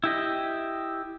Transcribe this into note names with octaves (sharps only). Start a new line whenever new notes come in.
E4 G4 D#5